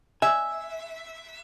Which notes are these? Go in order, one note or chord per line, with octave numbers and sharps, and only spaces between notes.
E5 G#5